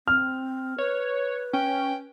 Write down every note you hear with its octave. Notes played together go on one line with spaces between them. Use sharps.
C4 F6
B4 C#5
C#4 G5